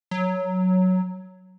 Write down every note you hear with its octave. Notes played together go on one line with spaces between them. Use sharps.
F#3